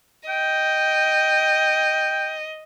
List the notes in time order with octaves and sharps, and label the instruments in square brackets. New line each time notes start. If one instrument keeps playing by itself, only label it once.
[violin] D#5 [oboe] G5